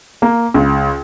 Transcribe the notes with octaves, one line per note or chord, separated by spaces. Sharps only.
A#3
C#2